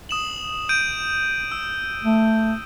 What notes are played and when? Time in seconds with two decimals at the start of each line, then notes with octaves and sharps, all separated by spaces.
0.09 D#6 E7 F#7
0.69 G6 D7 D#7
1.52 E6
2.04 A3